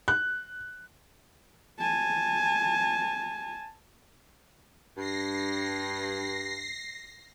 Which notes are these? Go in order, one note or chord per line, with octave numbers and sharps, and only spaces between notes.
F#6
G#5 A5
G2 A#6 C7